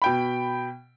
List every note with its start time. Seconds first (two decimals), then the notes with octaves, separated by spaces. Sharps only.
0.02 B2 G5 B5